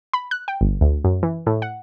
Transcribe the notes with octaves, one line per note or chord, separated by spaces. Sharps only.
B5
F#6
G5
G1
D2
F#2
E3
A2
F#5